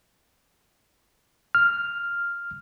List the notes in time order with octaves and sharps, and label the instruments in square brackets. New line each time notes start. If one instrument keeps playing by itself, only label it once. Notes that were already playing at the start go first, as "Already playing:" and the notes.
[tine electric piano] F6